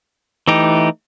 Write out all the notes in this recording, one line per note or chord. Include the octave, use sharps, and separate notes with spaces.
E3 A3 D#4 G4